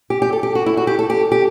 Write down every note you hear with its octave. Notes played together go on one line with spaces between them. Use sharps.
G4
G4
A4
G4
F#4
E4
F#4
G4
A4
G4
G4